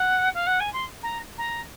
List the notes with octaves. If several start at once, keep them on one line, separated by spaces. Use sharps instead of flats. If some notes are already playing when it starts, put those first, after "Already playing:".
Already playing: F#5
F5
F#5
G#5
C6
A#5
A#5